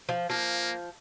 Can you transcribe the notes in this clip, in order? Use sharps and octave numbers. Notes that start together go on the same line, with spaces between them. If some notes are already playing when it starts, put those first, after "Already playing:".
F3
F3 A#3